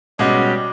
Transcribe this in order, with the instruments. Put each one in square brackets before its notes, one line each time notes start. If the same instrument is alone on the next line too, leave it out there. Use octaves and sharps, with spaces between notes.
[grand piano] B2 G#3 C#4 F#4 [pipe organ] G3 G4